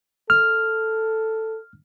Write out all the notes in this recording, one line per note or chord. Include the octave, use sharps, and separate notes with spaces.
A4 F6